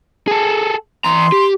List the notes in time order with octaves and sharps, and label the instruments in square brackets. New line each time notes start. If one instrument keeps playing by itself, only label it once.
[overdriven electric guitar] G#4 A4
[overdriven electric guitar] E3 A#5 [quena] C6
[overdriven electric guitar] G4